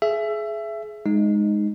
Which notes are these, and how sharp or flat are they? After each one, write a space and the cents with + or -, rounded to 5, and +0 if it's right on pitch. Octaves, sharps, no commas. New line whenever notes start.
G#4 +25 E5 +20
G#3 +0 D#4 -10